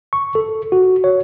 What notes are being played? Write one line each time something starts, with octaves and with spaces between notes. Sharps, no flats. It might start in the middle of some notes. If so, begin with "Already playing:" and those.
C#6
A4
F#4
C#5